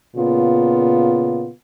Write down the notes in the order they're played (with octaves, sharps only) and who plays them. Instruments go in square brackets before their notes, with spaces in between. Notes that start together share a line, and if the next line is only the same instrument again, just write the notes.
[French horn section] A#2 C#3 B3 F4